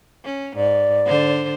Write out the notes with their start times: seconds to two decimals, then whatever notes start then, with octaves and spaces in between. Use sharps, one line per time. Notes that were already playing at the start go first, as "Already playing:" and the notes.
0.24 C#4
0.56 G#2 D5
1.06 D3 C5